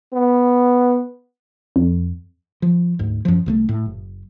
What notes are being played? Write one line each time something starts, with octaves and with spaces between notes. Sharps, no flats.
B3
F2
F3
D2 G#2
F#2 F3
C2 F3 A3
A2
F#1